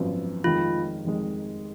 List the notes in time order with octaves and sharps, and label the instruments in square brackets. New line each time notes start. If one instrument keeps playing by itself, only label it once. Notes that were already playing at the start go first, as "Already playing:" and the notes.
Already playing: [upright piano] G#1 F#2 F3 B3
[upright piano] F1 F2 D#3 G#3 [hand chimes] F4
[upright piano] F1 F2 D#3 G#3